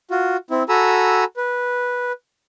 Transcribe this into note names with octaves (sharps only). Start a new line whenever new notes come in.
F4 F#4
C4 E4
F#4 A4 G#5 A#5 B5 E6
B4